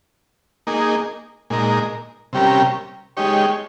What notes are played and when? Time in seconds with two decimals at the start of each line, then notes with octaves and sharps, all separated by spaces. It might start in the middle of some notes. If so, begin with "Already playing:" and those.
0.67 A#3 D#4 G#4
1.50 A#2 G#3 D#4 A#4
2.33 C3 G3 C#4 G4 A#4
3.17 G#3 D#4 G4 C#5